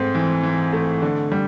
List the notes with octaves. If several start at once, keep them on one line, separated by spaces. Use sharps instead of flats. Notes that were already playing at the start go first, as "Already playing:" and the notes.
Already playing: G#2 A3 C4
E3
E3
A3
D3
G3